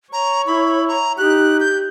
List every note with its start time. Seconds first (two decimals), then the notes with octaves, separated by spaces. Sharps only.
0.13 C#5 A#5
0.47 E4 B5
0.88 A#5
1.18 D#4 G4 F#6
1.60 G6